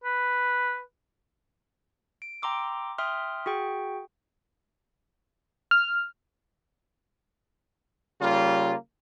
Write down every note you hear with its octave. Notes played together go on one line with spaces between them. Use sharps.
B4
D7
G5 A#5 C6 D6 E6
E5 G5 C6 D#6 F6
F#4 G#4 G5
F6
C#3 G3 A#3 F4